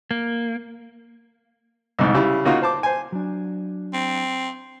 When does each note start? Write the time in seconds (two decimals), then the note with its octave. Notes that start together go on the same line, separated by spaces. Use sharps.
0.11 A#3
1.99 C2 F2 G#2
2.14 C#3 G3 E4
2.45 C#3 A#3 D#4 F4 F#4
2.62 C5 A5 D6
2.83 C5 G#5
3.12 F#3 D4
3.93 C4